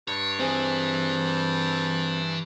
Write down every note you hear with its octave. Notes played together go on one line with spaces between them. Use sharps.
G2 C#5
E3 C4 G#4